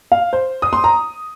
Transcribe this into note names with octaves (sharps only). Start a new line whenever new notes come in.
F5
C5
D#6
C6
A#5